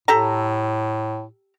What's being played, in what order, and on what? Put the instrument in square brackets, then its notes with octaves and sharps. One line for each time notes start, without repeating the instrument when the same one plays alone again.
[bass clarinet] A2 [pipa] G4 A4 A#5